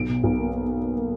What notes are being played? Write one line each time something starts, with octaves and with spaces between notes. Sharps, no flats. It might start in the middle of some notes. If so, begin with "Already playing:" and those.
Already playing: B1 D7
B2
B1
A#3
A#3
A#3
A#3
A#3